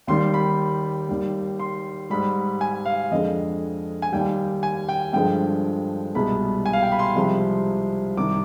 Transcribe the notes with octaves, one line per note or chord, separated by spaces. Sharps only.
D#2 D#3 G3 C6
B5
D#2 D#3 G3
C6
G#2 G3 B5
G#5
F5
F2 D3 G#3 D#5
G#5
D#2 D#3 G3 G5
G#5
G5
G2 D3 F3 G#3 G5
C2 B2 G#3 B5
G#5
F5
G5
B5
C6
C2 C3 F3 G#3 C6
C2 C3 D#3 D6